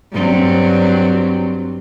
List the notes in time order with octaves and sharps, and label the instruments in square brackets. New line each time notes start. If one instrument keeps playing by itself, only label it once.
[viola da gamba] G2 F#3 C4